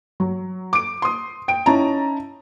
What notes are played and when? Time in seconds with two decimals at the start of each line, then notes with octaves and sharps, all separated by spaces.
0.20 F#3
0.73 D6 D7
1.02 C6 D#6
1.48 G5 D7
1.66 C#4 D#4 E4 A5 A#5